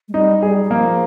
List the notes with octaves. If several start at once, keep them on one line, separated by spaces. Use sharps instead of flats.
G#3
G3 D#4
G3 G#4
G3
F3 A#3